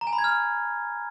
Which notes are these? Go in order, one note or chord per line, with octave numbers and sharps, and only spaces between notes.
A#5
G#5
B5
G#6
F6